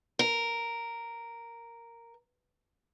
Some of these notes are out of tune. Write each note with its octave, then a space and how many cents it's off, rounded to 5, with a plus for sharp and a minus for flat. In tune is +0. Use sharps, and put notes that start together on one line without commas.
A#4 -5